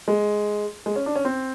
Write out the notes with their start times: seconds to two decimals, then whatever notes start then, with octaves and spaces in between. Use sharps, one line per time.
0.08 G#3
0.86 G#3
0.96 C#4
1.06 D4
1.15 C#4
1.25 C4